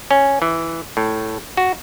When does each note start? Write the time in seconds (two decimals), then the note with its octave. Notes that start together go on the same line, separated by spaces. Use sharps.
0.11 C#4
0.42 E3
0.97 A2
1.57 F#4